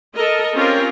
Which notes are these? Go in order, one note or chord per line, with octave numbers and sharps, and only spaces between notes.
A4 A#4 D#5
C4 C#4 F4 G4 A#4 C5